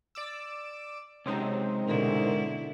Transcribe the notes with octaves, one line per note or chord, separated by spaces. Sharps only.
D5 D6 E6
C3 F#3 G#3 C4 C#4 D#4
G#2 B2 D3 E4 A#4